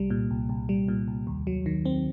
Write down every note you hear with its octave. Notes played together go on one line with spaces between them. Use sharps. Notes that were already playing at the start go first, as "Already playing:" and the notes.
Already playing: C2 G3
A#2
C2
C2
G3
A#2
C2
D#2
F#3
D#3
C4